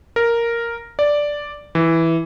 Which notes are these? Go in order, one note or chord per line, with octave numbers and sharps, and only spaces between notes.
A#4
D5
E3